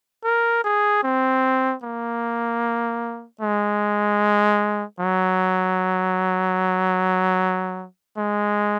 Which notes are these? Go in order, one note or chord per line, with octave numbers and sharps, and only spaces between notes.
A#4
G#4
C4
A#3
G#3
F#3
G#3